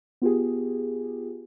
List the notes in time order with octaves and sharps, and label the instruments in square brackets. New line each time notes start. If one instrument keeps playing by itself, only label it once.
[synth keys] B3 F4 G4 G#4